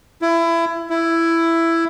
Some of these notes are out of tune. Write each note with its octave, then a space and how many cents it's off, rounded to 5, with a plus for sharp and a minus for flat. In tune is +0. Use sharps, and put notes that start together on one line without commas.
E4 +25
E4 +10